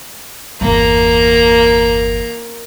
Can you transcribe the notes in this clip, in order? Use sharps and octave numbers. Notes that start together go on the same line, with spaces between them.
G1 E2 A#3 A#5